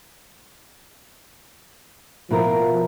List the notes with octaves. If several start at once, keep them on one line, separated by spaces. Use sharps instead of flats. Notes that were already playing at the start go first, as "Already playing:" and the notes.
B2 F3 E4 A#4